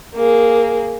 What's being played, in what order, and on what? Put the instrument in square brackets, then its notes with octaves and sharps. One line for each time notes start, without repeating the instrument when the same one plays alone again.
[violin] A#3 G#4